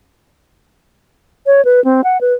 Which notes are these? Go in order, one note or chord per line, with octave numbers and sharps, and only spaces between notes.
C#5
B4
C4
F#5
B4